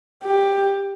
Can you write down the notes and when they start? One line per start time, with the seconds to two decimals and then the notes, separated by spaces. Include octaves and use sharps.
0.23 G4